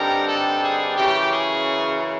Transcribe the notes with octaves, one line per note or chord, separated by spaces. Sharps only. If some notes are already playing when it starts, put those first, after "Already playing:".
Already playing: G2 D3 G3 C4 D#4 A#4
A4
G#4
F#2 C#3 E3 G4
G#4